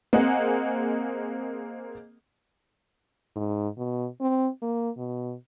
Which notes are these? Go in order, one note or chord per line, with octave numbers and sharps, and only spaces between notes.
A#3 C4 G#4 D#5 F#5
G#2
B2
C4
A#3
B2